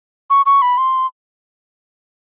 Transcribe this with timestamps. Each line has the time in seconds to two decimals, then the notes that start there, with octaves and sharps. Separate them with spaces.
0.30 C#6
0.46 C#6
0.62 B5
0.78 C6